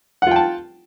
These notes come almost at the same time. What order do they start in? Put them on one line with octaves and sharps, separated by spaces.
F#5 F4 G5 A5